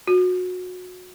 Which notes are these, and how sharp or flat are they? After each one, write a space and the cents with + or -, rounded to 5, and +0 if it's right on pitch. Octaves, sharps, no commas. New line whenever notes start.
F#4 -25